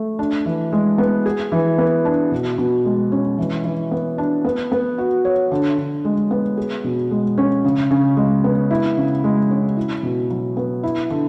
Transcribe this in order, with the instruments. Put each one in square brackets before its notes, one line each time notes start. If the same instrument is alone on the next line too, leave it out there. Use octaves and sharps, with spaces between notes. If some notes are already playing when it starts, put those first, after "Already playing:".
Already playing: [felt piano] A3
D4
E3
G#3
B3
G#4
E3
B3
D4
B2
B2
G#3
C#4
E3
E3
B3
D4
B3
B3
F#4
C#5
D3
D3
G#3
B3
G#4
B2
G#3
C#4
C#3
C#3
G#3
B3
E4
C#3
G#3
C#4
E4
B2
F#3
B3
E4
D3